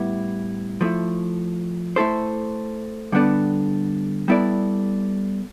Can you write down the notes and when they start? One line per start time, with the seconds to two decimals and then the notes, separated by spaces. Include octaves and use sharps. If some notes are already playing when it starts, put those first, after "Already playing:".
Already playing: A2 G3 B3 E4
0.81 F3 A3 E4
1.96 A3 E4 A4 C5
3.12 D3 G3 B3 D4 A4
4.28 G3 B3 E4 A4 D5